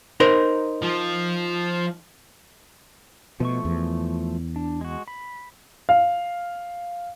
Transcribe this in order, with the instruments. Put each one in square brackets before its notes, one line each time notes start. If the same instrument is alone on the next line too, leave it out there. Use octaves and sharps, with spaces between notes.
[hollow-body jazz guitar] D#4 A#4 C5
[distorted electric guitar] F3
[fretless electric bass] B2 [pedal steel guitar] F3 A3 C#6
[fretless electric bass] E2
[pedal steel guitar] D4
G#3 F#4
B5
[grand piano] F5